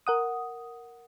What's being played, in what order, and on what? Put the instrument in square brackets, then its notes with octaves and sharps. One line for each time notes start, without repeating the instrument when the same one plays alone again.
[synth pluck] A#4 F#5 D#6